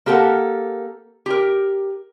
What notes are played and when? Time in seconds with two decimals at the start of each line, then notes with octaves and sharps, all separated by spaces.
0.06 A#3 G4 A4 A#4 F#5
1.26 G4 A#4